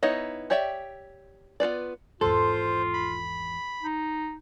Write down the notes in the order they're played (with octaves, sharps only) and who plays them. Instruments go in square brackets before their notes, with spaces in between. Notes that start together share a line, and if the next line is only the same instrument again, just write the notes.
[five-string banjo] B3 D#4 E4 C#5 D#5
G4 C#5 D5 E5 G5
B3 F4 B4 D5
[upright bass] G#1 E2 [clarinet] F4 [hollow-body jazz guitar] A4 [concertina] C5
[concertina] B5
[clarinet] D#4